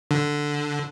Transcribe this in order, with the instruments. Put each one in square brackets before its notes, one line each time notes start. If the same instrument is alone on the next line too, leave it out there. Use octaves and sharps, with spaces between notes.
[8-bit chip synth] D3